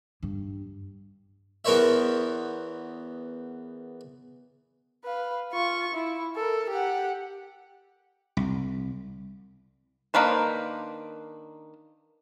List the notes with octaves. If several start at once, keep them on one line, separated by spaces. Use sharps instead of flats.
G2
E2 B3 A#4 C5 C#5 E5
B4 F5
F4 C#6
E4
A4 A#4
G4 F#5
C2
D#3 A#3 D4 B4 C5